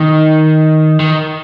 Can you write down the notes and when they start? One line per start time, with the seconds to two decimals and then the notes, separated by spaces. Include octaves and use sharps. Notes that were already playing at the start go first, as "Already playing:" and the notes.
Already playing: D#3
1.00 D#3